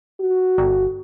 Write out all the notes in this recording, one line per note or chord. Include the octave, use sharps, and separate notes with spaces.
F#4
G1